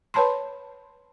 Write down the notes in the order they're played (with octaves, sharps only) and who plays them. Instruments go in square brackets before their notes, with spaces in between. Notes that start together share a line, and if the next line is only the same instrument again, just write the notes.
[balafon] B4 C#5 A5 B5 C6